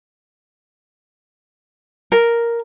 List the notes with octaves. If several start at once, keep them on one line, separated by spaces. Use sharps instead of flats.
A#4